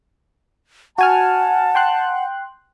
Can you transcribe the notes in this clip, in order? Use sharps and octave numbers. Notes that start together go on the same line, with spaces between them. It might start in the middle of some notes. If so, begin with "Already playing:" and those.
F#4 F#5 G#5 A5 F6
G5 C6 F#6